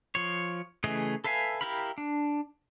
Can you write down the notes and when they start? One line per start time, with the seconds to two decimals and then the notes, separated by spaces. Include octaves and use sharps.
0.15 F3 C#5
0.84 C#3 E3 A3 G#4 D#5
1.24 A4 B4 E5 F5 G#5
1.61 E4 G4 A#4 F5 B5
1.98 D4